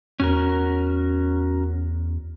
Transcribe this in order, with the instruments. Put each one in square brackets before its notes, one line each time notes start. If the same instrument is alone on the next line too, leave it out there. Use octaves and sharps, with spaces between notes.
[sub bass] E2 [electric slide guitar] C#4 F#4 A#4